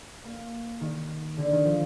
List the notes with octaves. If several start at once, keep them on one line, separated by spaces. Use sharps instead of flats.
A#3
D#3
D3
D#3
F3